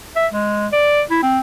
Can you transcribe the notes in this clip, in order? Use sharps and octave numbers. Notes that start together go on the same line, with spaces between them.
E5
G#3
D5
E4
C4